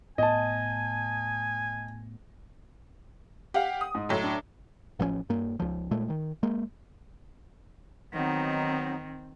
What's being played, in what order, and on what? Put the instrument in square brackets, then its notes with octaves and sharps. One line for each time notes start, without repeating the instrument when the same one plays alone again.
[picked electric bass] A2 B3 [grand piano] D#5 A5 [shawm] G#5
[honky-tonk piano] G4 F5 [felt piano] F#5
[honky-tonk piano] D#6
[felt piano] G#2
[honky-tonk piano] A2 F#3
[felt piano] D4
[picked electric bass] A1 F3 A3 C#4
G2 A#3
C#2 F3
A#2 G#3 A3
D#3
G#3 A#3
[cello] D#3 [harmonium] F#3 B3 D#4 [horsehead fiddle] C4